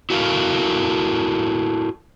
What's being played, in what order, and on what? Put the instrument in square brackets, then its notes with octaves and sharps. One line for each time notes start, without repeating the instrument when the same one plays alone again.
[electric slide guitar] E4 F#4 A4 A#4 F5